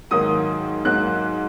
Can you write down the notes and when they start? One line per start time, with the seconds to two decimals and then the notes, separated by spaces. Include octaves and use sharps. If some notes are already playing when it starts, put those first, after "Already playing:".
0.11 G#2 D#3 F#3 A#3 D#6
0.85 G#2 F#3 A#3 F#6